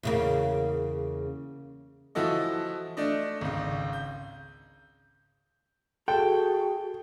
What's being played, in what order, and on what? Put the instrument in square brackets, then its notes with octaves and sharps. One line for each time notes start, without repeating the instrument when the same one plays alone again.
[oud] E2 C#3 A#3
[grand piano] E3 F3 E4 F#4 A4 D#5
A3 D4 D#5
G#1 C#2
G6
[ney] F#4 [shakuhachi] G#4 [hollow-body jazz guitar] A4 [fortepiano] G5